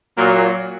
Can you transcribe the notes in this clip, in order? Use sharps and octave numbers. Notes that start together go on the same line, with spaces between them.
A#2 F#3 A#3